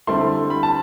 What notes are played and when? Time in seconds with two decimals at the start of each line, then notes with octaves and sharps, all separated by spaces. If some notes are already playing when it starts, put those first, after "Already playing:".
0.07 D3 G3 C4 E4 A4 C6
0.50 B5
0.63 A5